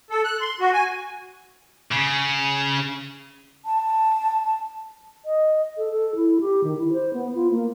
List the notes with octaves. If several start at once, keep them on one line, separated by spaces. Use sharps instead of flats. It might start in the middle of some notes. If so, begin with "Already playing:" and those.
A4
F#6
C6
F#4
G#5
C#3
A5
D#5
A4
A4
E4
G4
D#3
E4
C5
B3
F4
A#3